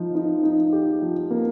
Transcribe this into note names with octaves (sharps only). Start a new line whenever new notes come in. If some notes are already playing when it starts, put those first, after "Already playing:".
Already playing: F3 D#4
D#4
D#4
G4
F3
A#3